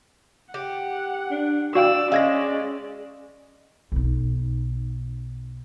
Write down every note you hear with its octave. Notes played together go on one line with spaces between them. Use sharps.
G4 F#5
D4
F#4 D5 F5 G5 E6
G#3 C#4 F5 G#6 A#6
B1 D#4